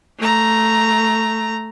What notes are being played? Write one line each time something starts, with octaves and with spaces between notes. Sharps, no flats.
A3 A#5